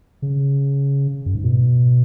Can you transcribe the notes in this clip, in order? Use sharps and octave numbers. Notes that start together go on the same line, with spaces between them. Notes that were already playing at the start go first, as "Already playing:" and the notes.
C#3
F#2
G#2
B2